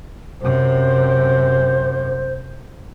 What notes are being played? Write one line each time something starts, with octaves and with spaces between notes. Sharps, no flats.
F#2 C3 C5